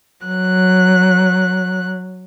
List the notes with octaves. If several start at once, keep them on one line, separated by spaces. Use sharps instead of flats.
F#3 F#6